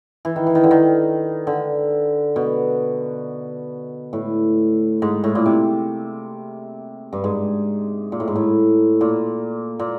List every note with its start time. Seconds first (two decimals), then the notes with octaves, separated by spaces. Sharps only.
0.25 E3
0.36 D#3
0.47 E3
0.55 D#3
0.64 D3
0.71 D#3
1.47 D3
2.36 B2
4.13 A2
5.02 G#2
5.24 A2
5.35 A#2
5.46 C3
7.13 G2
7.24 G#2
8.12 A#2
8.20 A2
8.28 G#2
8.36 A2
9.01 A#2
9.79 A#2